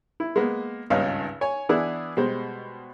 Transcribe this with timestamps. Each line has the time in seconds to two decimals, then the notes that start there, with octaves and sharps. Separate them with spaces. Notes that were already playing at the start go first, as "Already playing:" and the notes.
0.20 E4
0.36 G#3 A#3 B3
0.90 G#1 C#2 G2 C#4 D#4 F5
1.41 C#5 G#5
1.69 E3 B3 D4 E4 G#4
2.17 B2 G3 G#3 C5